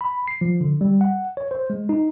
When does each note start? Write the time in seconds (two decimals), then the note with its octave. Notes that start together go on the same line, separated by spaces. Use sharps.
0.01 B5
0.28 C7
0.41 F3
0.61 D3
0.81 G3
1.01 F#5
1.37 C#5
1.51 C5
1.70 G#3
1.89 D#4